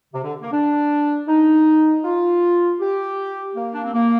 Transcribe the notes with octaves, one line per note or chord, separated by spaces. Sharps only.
C3
D3
A#3
D4
D#4
F4
G4
A#3
D4
C4
A#3